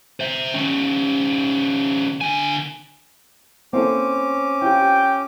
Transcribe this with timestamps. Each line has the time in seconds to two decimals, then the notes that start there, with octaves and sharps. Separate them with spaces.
0.20 C5 E5
0.54 D#3 C#4
2.21 D3 G#5
3.73 A#3 C4 C#4 E4 A4 D6
4.62 E4 F4 G4 G5